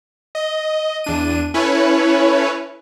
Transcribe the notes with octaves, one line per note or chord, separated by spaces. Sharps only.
D#5
E2 D4 D#7
C#4 E4 A4 B4 C#5